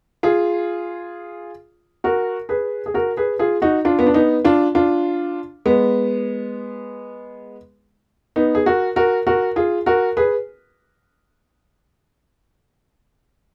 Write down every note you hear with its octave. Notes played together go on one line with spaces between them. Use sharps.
F4 G#4
F#4 A#4
G#4 B4
G#4
F#4 A#4
G#4 B4
F4 G#4
D#4 F#4
D4 F4
B3
D4
B3 D#4
D4 F4
D4 F4
G#3 B3
B3 D#4
G#4
F#4 A#4
F#4 A#4
F#4 A#4
F4 G#4
F#4 A#4
G#4 B4